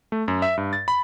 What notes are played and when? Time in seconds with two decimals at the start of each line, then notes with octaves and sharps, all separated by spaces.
0.12 A3
0.28 F#2
0.42 E5
0.57 G2
0.73 A6
0.88 B5